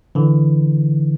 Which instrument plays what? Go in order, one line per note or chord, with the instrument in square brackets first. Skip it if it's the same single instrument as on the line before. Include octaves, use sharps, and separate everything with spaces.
[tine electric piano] D3 E3